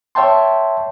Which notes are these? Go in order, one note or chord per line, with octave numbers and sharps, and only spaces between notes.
C#5 E5 G5 A5 C6